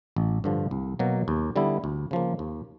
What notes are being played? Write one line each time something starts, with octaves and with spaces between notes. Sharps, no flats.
A1
G2 D3 F3
C2
B2 F#3 A#3
D#2
D3 G3 B3 E4
D2
C#3 F3 A#3
D#2